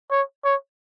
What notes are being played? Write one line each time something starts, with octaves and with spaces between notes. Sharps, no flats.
C#5
C#5